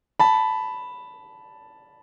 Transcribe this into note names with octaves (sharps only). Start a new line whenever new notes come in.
A5 B5